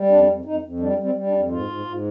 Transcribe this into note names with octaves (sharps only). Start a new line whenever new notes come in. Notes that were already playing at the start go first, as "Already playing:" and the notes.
Already playing: G3
F2 D4
F2
F2 D#4
F2
G3 D4
G3
C4
G3
D4
F2
G#2 F4
G#2
G#2